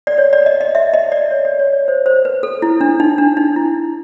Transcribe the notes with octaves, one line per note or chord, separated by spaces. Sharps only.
D5
C#5
D5
D#5
D#5
E5
D#5
D5
C#5
D5
C#5
C#5
C5
C5
B4
A4
E4
D4
D#4
D4
D#4
E4